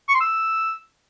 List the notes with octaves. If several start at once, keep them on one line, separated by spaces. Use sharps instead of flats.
C#6
C6
E6